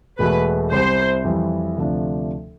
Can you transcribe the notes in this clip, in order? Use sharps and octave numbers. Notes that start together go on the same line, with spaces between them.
E1 E2 B2 A3 B4
C2 C3 G3 C5
F2 E3 G3
D2 C3 F3 A3 D4